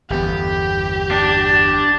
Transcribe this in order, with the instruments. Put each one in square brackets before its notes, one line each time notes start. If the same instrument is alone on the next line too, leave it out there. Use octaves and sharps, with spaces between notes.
[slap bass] G1 E2 B3 [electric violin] G4
[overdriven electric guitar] D4